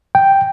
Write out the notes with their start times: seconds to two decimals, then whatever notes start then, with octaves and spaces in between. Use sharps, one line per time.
0.15 G5